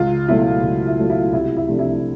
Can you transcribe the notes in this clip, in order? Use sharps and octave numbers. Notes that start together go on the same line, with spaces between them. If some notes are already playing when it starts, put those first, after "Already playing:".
Already playing: C#2 F4
B2 F#3 A3 E4
C#2
E4
B2 F#3 A3
E4
C2 E4
E4
C3 F3 A3 D4
E4